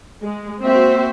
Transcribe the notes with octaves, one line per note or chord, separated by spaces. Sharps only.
G#3
A#3 C4 F#4 C5 E5